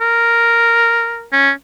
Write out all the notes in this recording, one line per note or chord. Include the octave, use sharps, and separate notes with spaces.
A#4
C#4